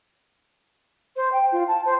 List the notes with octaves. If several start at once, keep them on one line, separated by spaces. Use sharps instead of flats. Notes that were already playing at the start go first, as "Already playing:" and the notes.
C5
G5
F4
A5
C5